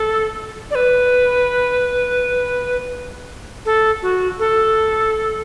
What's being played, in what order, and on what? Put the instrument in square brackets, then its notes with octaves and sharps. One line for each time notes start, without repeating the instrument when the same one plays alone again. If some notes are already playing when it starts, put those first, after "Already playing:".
Already playing: [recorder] A4
D5
B4
A4
F#4
A4